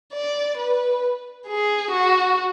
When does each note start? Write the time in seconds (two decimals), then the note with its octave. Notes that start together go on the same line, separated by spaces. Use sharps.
0.13 D5
0.57 B4
1.47 G#4
1.91 F#4